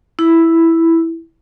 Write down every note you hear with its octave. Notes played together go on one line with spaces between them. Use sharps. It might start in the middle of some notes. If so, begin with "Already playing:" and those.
E4